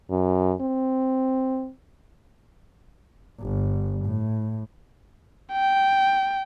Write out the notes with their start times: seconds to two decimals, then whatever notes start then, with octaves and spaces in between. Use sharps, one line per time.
0.10 F#2
0.61 C4
3.40 G1
4.05 A2
5.53 G5